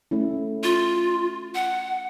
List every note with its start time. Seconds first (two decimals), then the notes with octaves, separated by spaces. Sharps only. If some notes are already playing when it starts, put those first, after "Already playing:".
0.11 A3 C#4 E4
0.63 F4
1.55 F#5